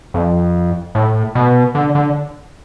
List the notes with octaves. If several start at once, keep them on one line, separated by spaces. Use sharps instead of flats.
F2
A2
B2
D3
D3